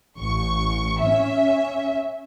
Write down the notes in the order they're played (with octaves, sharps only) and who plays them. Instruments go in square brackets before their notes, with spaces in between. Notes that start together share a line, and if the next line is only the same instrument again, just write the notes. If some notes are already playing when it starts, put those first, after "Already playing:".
[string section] A1 C#6
C#4 E5